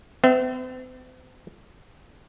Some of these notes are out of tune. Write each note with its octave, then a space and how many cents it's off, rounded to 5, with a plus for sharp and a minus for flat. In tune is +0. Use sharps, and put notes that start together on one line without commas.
C4 -45 E5 +0